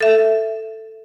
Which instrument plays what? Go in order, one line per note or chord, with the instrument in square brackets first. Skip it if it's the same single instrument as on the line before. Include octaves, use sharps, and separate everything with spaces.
[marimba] A4 E5